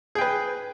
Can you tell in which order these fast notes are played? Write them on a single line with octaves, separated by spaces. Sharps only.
G#4 G5 B4